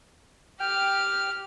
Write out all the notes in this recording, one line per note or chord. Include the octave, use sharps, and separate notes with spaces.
G4 G5 F6